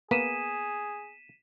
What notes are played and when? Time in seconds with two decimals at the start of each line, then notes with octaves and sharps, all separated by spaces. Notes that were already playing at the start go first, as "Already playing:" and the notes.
0.11 A#3 B3 G#4 B6 D#7 E7